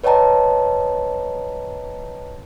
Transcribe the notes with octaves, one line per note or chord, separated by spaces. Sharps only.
B4 C#5 D#5 G5 A5 A#5